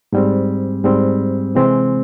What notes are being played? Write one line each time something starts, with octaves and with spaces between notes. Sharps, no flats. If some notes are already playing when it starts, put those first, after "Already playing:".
G#2 G3 C4
G#2 G3 C4
C3 E3 G#3 C4